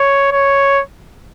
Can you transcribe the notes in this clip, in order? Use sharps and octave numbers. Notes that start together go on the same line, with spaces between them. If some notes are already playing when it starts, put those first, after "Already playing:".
Already playing: C#5
C#5